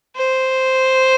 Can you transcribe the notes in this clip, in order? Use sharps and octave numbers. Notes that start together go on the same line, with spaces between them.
C5